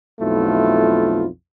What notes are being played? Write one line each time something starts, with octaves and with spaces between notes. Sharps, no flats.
B1 F2 A3 E4 F4